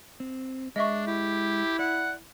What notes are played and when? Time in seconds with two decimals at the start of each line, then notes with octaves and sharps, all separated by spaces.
0.20 C4
0.76 G#3 D4 D#5 E5 C#6
1.07 E4 G4
1.79 D5 F#5